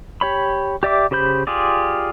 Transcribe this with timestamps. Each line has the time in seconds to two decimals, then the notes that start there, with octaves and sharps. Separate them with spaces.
0.21 G4 C#5 B5
0.83 G4 D5 E5 D6
1.11 C#3 G4 C5 B5 G6
1.47 F4 G4 G#4 D5